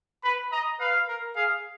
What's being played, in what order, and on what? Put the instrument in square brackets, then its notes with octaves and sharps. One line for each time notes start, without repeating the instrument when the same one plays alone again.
[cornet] B4 [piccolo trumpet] B5
[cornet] D#5 [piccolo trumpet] A#5
[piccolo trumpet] B4 [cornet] F5
[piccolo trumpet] A#4
[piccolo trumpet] G#4 [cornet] F5